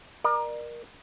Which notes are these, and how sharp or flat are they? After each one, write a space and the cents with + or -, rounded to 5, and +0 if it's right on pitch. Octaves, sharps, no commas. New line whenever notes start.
A#4 +20 D5 +40